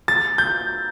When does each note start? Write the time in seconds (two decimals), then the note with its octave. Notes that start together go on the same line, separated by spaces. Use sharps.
0.08 A6
0.38 G6